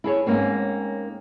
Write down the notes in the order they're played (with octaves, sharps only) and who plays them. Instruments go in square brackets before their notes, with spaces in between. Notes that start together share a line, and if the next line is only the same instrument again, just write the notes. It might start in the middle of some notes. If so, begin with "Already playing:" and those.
[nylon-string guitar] E4 G#4 C#5
G#2 A#3 C4 C#4